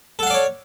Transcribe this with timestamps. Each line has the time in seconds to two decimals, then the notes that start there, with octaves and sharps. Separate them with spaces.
0.19 A4
0.23 F#5
0.27 F5
0.30 D5
0.34 C#5